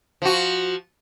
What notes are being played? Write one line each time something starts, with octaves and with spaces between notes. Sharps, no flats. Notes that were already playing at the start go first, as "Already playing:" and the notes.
F3 F#4